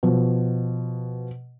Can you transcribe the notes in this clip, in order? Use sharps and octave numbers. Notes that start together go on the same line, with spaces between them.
B2 F3